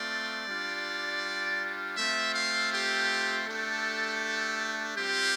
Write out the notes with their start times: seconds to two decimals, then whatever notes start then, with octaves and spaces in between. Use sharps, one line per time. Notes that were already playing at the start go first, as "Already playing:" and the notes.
Already playing: A3 C4 F4 D5
0.47 G3 D4 F4
1.96 A3 C4 F4 E5
2.34 F5
2.72 G4
3.47 A3 D4 G4 A4
4.96 G3 C4 F4 G4